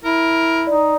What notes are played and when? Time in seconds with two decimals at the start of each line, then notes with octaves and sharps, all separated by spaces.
0.04 E4 A#4
0.67 D#4 D5